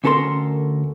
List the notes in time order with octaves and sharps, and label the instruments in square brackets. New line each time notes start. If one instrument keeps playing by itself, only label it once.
[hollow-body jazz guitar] D2 C#4 A4 A#4 C6